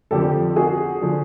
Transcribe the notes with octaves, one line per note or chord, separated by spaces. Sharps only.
F2 D3 F3 G4 A4
F#4 G#4
D3 F3